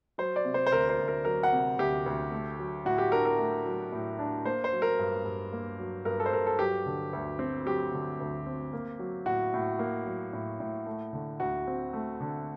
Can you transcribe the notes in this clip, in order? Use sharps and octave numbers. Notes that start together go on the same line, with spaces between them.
F#3 C5
D5
C3
C5
C5
D2 A#4
C5
D2
A#4
F#3 A#4
F#5
C3
D2 G4
D2
A3
F#3
A2 F#4
G4
D4 A#4
A#4
A3
F#3
A2
D4
A#3 C5
C5
F#3
A#4
G2
G2
A#3
F#3
G2 A#4
A4
C5
G2 A#4
A4
F#3 G4
D3
D2
C4
F#3 G4
D3
D2
C4
A#3
F#3
A2 F#4
A2
A#3
F#3
A2
A2
A3
D3
D2 F#4
C4
A3
D3